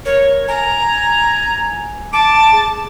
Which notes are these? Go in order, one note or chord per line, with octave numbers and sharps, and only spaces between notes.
A#4 C#5
G#5 A#5
A5 D6
G#4